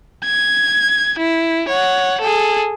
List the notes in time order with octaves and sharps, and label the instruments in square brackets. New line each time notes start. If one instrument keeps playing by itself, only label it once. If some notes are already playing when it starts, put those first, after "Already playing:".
[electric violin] G#6
E4
C#5 F#5
G#4 A4